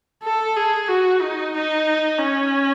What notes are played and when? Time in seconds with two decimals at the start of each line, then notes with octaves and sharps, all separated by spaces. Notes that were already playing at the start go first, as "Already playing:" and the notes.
0.23 A4
0.56 G#4
0.88 F#4
1.21 D#4
1.54 D#4
2.19 C#4